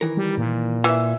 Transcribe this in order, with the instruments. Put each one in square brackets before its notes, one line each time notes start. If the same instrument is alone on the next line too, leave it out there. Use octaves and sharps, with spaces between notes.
[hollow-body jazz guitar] D#3 E3 A#4
[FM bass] G3
A#2
[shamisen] E3 [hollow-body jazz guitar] F4 E5